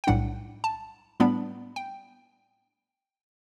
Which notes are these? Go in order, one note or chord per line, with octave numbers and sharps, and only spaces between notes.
G5
B1 A2 G3 D4 F#5
A5
A2 G3 B3 D4 B5
G5